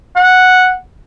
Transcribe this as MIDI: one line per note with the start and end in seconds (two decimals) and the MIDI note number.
0.16 0.73 78